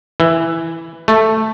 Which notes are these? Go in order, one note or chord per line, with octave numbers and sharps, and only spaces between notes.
E3
A3